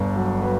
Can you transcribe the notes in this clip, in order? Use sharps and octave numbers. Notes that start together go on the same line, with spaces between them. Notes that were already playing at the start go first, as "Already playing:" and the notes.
Already playing: G1 G2 A4
F#3
F#3 B4